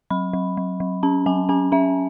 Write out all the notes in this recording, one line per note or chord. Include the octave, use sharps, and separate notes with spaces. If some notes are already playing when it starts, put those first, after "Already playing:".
F#3 B5
F#3
F#3
F#3
C#4 A5
F#3 G#5
C#4 G#5
C#4 E5